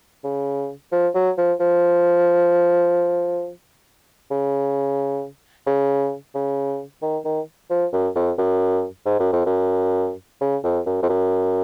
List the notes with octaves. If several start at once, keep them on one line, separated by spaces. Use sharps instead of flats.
C#3
F3
F#3
F3
F3
C#3
C#3
C#3
D#3
D#3
F3
F#2
F2
F#2
G#2
F#2
F2
F#2
C#3
F2
F#2
F2
F#2